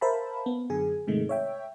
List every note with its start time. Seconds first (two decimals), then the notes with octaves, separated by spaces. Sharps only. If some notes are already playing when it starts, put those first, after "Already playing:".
0.01 A#4 C5 E5 F5 A5 B5
0.46 B3
0.70 F#2 D3 G#4 G#5
1.07 G#2 C3 D#3 G#3 A3
1.29 C#5 E5 G5